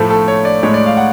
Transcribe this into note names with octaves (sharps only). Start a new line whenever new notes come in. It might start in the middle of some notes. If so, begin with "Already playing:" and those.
Already playing: A2 F3 A3 A4
A4
C#5
D5
A2 G#3 C#5
D5
F5
F#5